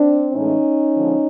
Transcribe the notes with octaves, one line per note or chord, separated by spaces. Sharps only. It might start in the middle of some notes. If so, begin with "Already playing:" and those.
Already playing: C4 D4
A2 E3 G#3 C#4 D#4
D3 F3 G#3